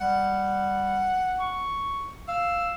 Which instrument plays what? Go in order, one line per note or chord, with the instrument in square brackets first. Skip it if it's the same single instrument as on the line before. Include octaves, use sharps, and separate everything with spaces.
[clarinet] G3 [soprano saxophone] F#5
[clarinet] C#6
[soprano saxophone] F5 [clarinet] E6